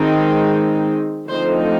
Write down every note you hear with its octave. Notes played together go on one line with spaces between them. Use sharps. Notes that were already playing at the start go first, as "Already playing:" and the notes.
Already playing: D#3 G#3 C4 D#4
D3 F3 A3 C4 D#4 C5